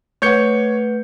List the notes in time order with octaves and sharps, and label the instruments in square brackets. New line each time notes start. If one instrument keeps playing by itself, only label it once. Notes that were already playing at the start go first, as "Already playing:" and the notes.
[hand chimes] A3 B4 F#5 [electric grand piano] C#5 G6 C#7